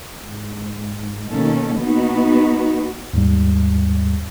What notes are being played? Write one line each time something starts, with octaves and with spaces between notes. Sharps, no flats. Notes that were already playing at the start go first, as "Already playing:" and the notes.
G#2
B2 D#3 A#3 C#4 A4
A#3 B3 D#4 F#4
D#2 G#2 G3